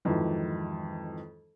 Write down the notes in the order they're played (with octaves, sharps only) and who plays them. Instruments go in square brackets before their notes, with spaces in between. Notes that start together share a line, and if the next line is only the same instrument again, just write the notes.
[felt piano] F2 G#2 D#3 E3 F#3